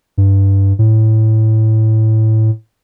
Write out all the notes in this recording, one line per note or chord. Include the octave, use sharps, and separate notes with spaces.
G2
A2